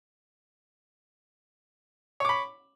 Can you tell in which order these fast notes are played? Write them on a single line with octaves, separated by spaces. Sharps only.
C#5 D6 B5